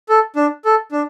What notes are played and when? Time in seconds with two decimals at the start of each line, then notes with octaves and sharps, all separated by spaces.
0.09 A4
0.36 D4
0.65 A4
0.92 D4